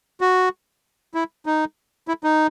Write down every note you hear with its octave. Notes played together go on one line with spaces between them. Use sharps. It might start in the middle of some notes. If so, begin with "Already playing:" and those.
F#4
E4
D#4
E4
D#4